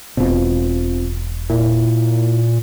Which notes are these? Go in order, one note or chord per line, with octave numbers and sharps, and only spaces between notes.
E1 B2 C4 F4
A#2 E4